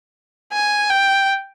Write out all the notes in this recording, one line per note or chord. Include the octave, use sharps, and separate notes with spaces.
G#5
G5